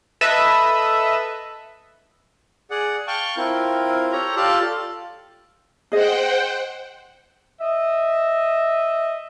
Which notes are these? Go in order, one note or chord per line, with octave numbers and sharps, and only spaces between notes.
A4 B4 D#5 E5
G#4 D5 F#5
F5 G5 A5 C#6
C4 E4 F4 A#4
G4 A4 C#5 A#5
F4 G4 A4 D5 F5 A5
G#4 C5 D#5 F#5 G5
D#5 E5